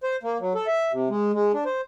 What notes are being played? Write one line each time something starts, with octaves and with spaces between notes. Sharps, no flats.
C5
A#3
F#3
A4
E5
C3
G#3
G#3
D4
C5